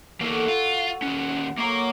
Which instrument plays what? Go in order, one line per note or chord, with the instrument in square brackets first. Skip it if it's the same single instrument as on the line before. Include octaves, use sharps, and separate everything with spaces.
[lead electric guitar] E2 A#3 [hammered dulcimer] F#4 A4
[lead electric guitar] F4
[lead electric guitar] D#2 C#4 [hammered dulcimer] C5 F#5
[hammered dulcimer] F#3 C#6 D6 [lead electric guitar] A#3 A#5